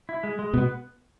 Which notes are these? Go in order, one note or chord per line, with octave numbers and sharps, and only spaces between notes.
E4
G#3
G#3
B2 B3